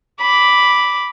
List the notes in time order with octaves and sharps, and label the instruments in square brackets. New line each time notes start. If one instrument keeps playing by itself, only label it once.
[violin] B5 D6